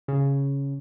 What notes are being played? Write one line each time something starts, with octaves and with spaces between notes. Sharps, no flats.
C#3